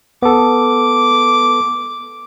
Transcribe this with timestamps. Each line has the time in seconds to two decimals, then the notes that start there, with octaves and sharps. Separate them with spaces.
0.22 B3 A4 D6